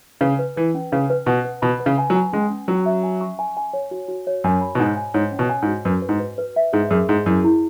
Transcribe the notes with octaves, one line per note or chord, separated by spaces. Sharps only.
C#3 B4
B4
E3 B4
C#4
C#3 B4
B4
B2 F#5
B4
B2 B5
B4
C#3
G#5
F#3
G#5
G#3 C#4
C#4
F#3 C#4
E5
G#5
C#6
G#5
G#5
C#5
F#4
F#4
C#5
F#2 G#5
B5
B2
G#2 G#5
G#5
G#2 C#5
C#4
B2
G#5
G#2
F#4
F#2 B4
B4
G#2
B4
B4
E5
G#2 G#4
F#2 G#4
G#2 G#4
F#2 E4
E4